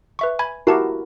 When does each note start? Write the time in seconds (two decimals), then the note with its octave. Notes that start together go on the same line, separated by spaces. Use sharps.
0.19 B4 E5 C#6
0.39 G#5 B5 G#6
0.67 E4 F#4 G4 A#4 A5 C7